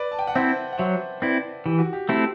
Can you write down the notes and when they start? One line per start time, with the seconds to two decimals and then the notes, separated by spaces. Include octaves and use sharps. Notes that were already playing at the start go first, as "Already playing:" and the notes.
Already playing: B4 D5
0.12 A5
0.19 G5
0.27 F#5
0.35 C4 E4 C5 E5
0.73 F#5
0.78 F#3 C5 E5
1.22 C4 E4 B4 D5
1.66 E3 G4
1.79 F#4
1.93 G4
2.08 A3 C4 E4 G4